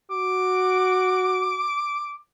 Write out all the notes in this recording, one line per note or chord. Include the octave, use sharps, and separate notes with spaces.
F#4 D6